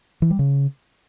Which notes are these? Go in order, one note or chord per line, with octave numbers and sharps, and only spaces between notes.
E3
G3
C#3